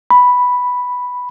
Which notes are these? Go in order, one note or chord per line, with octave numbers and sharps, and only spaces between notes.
B5